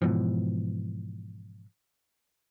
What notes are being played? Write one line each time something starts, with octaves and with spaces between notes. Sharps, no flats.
G#2 B2 E3 F3